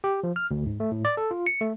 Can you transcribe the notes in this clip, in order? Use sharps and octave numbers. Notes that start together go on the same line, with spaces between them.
G4
F3
F6
D2
G#2
A3
A2
D5
A4
F4
C#7
A3